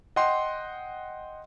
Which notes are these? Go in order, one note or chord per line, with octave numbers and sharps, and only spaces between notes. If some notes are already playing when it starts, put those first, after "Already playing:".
D#5 F#5 G5 C6